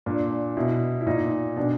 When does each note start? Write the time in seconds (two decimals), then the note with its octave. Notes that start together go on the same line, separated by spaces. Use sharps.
0.06 A#2 D4
0.57 B2 E4
1.01 E4
1.07 A#2 D#4
1.56 B2 D4